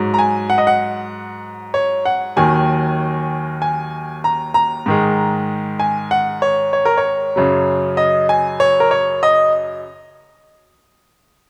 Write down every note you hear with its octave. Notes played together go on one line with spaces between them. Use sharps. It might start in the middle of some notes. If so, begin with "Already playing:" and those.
Already playing: G#2 F#3
A#5
G#5
F#5
D#5
F#5
C#5
F#5
D#2 D#3 F#3 G#5
G#5
A#5
A#5
G#2 D#3 G#3
G#5
F#5
C#5
C#5
A#4
C#5
F#2 C#3 F#3
D#5
G#5
C#5
A#4
C#5
D#5